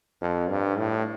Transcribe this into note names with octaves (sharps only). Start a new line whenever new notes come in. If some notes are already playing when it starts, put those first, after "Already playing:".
F2
G2
A2